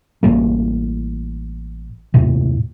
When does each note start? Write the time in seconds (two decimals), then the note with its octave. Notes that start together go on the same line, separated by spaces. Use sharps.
0.23 A1 G3 A#3
2.14 D#2 A2 C3